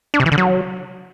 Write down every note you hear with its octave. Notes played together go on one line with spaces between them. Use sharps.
D4
C3
E3
D3
F#3